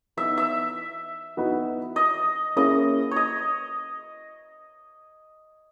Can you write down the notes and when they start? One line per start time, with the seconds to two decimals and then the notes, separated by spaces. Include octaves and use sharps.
0.17 E3 B3 D#4 E5
0.38 E5
1.37 E3 B3 D#4 F#4 B4
1.96 D#5
2.56 A#3 C#4 E4 G#4 D#5
3.11 C#5 D#5